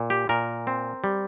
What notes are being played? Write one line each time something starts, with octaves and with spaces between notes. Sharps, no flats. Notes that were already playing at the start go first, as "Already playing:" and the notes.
Already playing: A#2
G4
A#2 A#4
C4
G3